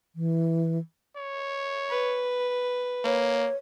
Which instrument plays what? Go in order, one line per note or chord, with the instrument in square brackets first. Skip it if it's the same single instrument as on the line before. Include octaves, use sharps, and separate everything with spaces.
[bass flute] E3
[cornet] C#5
[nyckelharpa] B4
[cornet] A#3 [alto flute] C#5